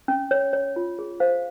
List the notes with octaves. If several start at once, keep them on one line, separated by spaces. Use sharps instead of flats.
C#4
C#5
C#5
F4
G#4
C5 F5